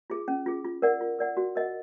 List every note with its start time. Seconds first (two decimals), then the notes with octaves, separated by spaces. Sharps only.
0.10 F4 G#4
0.28 C#4
0.46 F4 G#4
0.65 F4
0.82 A#4 D5 F#5
1.01 F4
1.19 A#4 D5 F#5
1.37 F#4
1.55 A#4 D#5 F#5